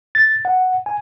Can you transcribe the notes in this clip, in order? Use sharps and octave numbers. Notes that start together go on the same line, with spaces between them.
A6
F#5
G#5